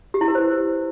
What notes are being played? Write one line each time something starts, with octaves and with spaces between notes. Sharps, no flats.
G4
E4
B4
C5